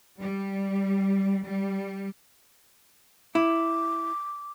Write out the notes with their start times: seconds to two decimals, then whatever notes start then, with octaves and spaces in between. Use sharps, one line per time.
0.19 G3
1.44 G3
3.35 E4 D6